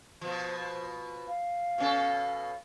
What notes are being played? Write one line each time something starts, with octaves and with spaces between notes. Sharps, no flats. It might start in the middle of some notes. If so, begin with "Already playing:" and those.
B2 F3 C5
F5
B2 C#4 A4